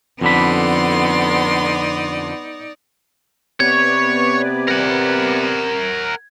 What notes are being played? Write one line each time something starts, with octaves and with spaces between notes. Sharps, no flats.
F2 D3 B3 D#4 D5 B5 C6
C3 B3 B4 C#5 D5 G#6
A#4 F#5